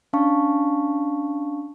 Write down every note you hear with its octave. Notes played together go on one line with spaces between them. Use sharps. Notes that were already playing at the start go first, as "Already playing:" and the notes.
C#4 D4 F5 A5 C#6